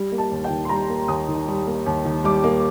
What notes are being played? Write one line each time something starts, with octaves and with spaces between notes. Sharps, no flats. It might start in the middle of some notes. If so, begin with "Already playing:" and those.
Already playing: G3
A#3
A5
D#2
G5
D#3
C6
G3 A#5
A#3
D#2 D#6
D#3
G3
A#3
D#2
D#3
G3 D6
A#3